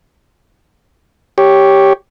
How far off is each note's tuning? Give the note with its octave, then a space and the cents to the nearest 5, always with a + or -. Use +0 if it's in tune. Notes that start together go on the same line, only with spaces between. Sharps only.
G4 +0 C#5 +0